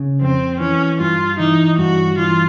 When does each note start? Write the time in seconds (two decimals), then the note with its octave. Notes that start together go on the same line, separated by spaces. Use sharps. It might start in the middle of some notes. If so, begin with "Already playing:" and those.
Already playing: C#3
0.21 F2 C4
0.60 E3 C#4
1.00 G2 F4
1.39 E3 D#4
1.78 G2 F#4
2.18 E3 F4